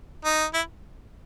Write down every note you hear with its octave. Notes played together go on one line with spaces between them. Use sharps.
D#4
E4